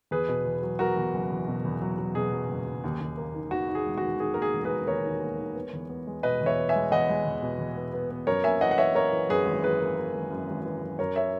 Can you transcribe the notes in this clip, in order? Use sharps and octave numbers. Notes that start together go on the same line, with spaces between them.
E2 G#4 B4
B2
E2
F#3
F#3 F#4 A#4
E2
F#1
E2
B2
E2
F#3
F#3
B2 G#4
F#3
F#1
F#1
D#2
D#2
A#3
D#3
D#3 F#4
D#3
G#4
E1
D#3 F#4
D#3 G#4
A#3 A#4
G#4
E1
G#4 B4
A#3
D#2 A#4 C#5
D#3
A#3
D#3
B3
E2
B3
G#3
B2 B4 D#5
E2
C#5 E5
B3
E5 G#5
G#3
E2 D#5 F#5
G#3
E2
B2
E2
B3
B3
B3
F#2 A#4 C#5
A#3 E5 G#5
E3 D#5 F#5
F#5
E3 C#5 E5
A#3 A#4 C#5
E3
F#2 G#4 B4
G#1
E3 G#4 B4
A#3
A#3
G#1
F#2
G#1
E3
F#2
F#2 A#4 C#5
C#5 E5